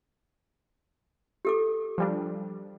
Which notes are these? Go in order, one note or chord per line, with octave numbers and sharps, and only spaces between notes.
G4 A4 D6
F3 G3 D4